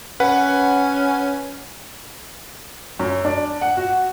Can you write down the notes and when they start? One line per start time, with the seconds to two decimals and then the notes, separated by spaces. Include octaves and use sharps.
0.20 C#4 B4 F#5
2.99 F#2
3.25 D4
3.61 F#5
3.77 F#4